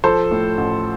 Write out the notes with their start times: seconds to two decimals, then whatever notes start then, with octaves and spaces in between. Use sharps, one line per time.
0.04 F3 A4 C5
0.31 A2
0.57 A1